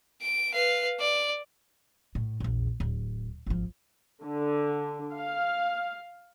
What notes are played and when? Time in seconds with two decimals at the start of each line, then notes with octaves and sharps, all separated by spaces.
0.22 D7
0.53 B4 F5
1.00 D5
2.15 A2
2.40 A#1 E2
2.80 D1
3.46 G#1 F3
4.23 D3
5.15 F5